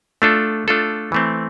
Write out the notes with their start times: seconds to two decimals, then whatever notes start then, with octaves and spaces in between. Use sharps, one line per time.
0.22 A3 D4 F4 A4
0.68 A3 D4 F4 A4
1.12 E3 A3 C4